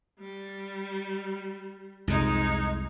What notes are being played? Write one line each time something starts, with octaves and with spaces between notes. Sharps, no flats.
G3
C2 F2 C3 G#3 D#4